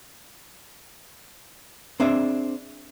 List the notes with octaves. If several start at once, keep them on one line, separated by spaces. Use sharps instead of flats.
C4 D4 G#4 E5